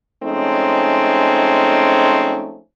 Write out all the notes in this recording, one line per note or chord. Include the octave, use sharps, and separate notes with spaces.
F3 G#3 A3 C4 C#4 D#4